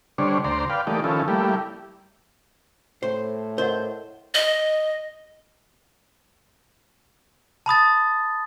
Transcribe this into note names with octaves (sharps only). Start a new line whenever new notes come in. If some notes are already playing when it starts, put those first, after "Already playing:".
D3 G3 D4 C5 C#5
D2 C5 D5 A#5 C6
B4 D5 F5 G5
E3 A3 A#3 D#4 G4 D5
D#3 F3 C#4 E4 A4
G3 A3 A#3 E4 G4
A2 C5
A#4 C5 D#5 F#5
D#5
A5 B5 D#6 A6